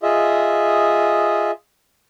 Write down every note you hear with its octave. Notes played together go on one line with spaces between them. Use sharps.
F4 G#4 D#5 E5